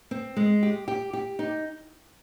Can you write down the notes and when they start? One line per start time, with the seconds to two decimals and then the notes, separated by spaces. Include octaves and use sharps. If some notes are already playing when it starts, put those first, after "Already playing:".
0.11 C4
0.37 G#3
0.63 G4
0.88 G4
1.13 G4
1.39 D#4